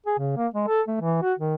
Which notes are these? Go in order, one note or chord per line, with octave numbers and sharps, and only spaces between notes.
G#4
C#3
A#3
G#3
A4
A3
E3
F#4
D#3